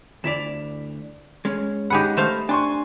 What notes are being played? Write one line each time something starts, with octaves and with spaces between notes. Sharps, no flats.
D2 E4 D5 E7 F7
G#3 C#4
D#4 G4 G#4 F#5 B5
A3 C5 F5
D4 G#5 C6 C#6